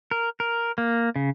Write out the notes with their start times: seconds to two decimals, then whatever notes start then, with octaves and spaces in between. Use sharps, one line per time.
0.11 A#4
0.40 A#4
0.78 A#3
1.16 C#3